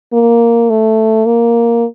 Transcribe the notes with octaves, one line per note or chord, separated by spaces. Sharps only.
A#3
A3
A#3